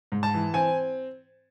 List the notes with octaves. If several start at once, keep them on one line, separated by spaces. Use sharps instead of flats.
G#2
A5
E3
C4 G#5